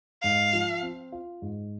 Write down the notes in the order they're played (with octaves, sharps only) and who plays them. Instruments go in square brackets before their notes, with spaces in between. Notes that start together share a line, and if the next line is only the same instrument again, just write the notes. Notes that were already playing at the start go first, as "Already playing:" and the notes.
[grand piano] G#2 [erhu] F5
[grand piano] F3
C4
F4
G#2